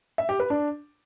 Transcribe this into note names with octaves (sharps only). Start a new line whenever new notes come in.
E5
G4
B4
D4